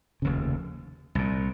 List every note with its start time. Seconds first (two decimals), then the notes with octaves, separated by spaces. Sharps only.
0.22 F1 D#2 C#3
1.15 C2 A#2